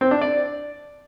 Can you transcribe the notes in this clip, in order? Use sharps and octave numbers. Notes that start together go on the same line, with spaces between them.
C4
D4
D5